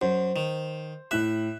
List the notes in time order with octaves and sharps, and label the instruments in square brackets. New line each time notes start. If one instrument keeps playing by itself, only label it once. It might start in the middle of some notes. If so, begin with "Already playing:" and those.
[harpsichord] F#2 [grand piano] C5
[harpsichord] D#3
[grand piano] A2 F#6 [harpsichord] E5